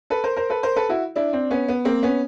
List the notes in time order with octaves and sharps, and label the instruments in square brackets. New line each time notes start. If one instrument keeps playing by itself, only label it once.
[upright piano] A4 B4
A#4 C5
A#4 C5
A4 B4
A#4 C5
A4 B4
E4 F#4
D4 E4
C4 D4
B3 C#4
B3
A#3 C4
B3 C#4